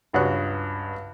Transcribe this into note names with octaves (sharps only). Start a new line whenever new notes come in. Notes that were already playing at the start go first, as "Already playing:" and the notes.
C#2 G2 F#4 C#5 D#6 F#6